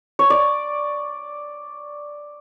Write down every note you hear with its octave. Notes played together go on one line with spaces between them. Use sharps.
C#5
D5